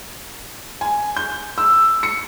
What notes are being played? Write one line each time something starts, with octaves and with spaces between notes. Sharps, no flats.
G#5
G6
E6
C#7